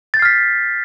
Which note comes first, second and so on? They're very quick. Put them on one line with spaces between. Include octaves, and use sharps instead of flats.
A6 G6 C7 F6 B6